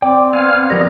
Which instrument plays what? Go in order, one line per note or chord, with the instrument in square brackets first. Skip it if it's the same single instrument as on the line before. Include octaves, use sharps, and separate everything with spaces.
[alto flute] C4 [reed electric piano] D5 [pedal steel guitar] G5 D6
[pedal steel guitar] B3 [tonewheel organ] F5 G#5 F6
[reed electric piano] F3 A#4 D5 [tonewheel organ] G4 D#5 A#5